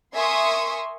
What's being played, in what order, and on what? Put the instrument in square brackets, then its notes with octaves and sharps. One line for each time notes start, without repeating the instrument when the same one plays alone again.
[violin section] A#4 E5 G#5 C6 C#6 D#6